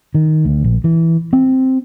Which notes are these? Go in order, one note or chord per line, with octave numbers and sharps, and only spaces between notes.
D#3
D2
A#1
E3
C4